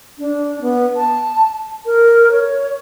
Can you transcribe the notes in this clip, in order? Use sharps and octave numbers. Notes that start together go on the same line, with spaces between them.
D4
B3
A5
A#4
C#5